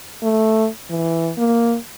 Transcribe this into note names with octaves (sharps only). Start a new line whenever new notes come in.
A3
E3
A#3